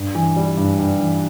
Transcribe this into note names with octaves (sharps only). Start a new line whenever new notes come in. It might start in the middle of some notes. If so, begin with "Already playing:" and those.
Already playing: G2
E3
G3
G2
G2
E3